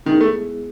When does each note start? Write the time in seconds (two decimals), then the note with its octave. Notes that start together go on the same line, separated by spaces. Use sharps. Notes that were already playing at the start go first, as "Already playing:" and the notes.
0.06 D#3 G#3 B3 E4 G#4
0.21 A3